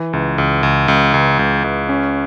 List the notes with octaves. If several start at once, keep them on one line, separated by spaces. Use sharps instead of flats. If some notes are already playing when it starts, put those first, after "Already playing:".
Already playing: E3
C#2
C#2
C#2
C#2
C#2
C#2
C#2
C#4